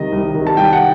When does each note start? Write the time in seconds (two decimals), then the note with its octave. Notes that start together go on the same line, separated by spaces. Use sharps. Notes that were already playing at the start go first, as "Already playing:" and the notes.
Already playing: C2 C3 D#3 D#5
0.12 C2
0.35 C3 D#3
0.47 A5
0.57 C2 G5
0.73 F#5